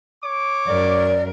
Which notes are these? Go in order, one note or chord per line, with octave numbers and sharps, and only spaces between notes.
C#5 D6
F#2 A#4 D5